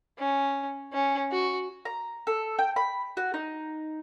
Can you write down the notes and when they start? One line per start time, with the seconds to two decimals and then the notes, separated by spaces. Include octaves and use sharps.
0.19 C#4
0.93 C#4
1.32 F#4
1.85 A#5
2.27 A4
2.59 G5
2.76 B5
3.17 F#4
3.34 D#4